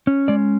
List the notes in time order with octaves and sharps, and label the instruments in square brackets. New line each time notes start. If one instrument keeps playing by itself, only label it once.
[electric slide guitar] C#4
G#3 D5